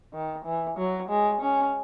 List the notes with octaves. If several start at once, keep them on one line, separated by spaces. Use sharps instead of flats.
D#3
E3
F#3
G#3
C#4